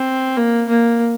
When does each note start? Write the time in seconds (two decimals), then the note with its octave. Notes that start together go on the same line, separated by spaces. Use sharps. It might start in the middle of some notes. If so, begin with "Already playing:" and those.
Already playing: C4
0.37 A#3
0.68 A#3